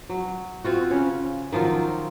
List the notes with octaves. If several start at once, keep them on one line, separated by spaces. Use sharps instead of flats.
F#3
C4 F4 F#4
C#3 C#4 C#5
D#3 F3 F#3 F4